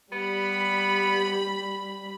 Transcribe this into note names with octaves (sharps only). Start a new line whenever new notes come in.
G3 B3 B5